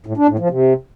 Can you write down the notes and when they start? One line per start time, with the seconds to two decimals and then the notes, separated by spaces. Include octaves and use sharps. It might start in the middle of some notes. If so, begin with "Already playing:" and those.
0.06 A2
0.17 D4
0.28 A2
0.39 F3
0.50 C3